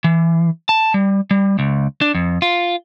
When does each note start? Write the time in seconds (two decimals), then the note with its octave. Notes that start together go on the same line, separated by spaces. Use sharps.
0.04 E3
0.69 A5
0.94 G3
1.31 G3
1.59 C#2
2.01 D4
2.15 F2
2.42 F4